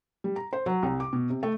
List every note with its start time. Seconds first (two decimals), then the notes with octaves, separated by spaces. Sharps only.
0.24 G3
0.36 A#5
0.53 C5
0.66 F#3
0.83 C2
1.00 D6
1.13 B2
1.30 C3
1.43 A3